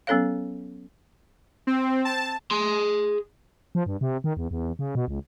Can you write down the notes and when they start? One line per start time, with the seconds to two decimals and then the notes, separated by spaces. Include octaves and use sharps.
0.07 F#3 B3 C#4 A4 C#5 F5
1.67 C4
2.05 A5
2.51 G#4 C6
3.75 F3
3.86 G2
4.01 C3
4.24 D#3
4.37 E2
4.51 E2
4.79 C#3
4.95 B2
5.08 C#2